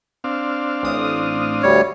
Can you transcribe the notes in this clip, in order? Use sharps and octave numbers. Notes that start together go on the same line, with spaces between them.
C4 D4 F5
A1 D#6
D2 G3 C#5